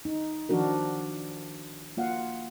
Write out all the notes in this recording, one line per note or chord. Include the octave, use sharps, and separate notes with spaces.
D#4
D#3 F3 D4 F#4 A#4
A#3 F4 F5 F#5